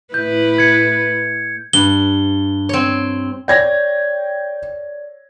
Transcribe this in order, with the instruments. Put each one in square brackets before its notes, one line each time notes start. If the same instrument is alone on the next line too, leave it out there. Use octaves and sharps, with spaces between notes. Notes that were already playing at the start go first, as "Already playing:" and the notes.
[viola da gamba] A2 E4 B4 [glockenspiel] G6
[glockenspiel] G#6 C#7
[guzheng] G2 [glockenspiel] G7
[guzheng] C4 C#5
[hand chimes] C#5 D5 [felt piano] G5 G#6 A#6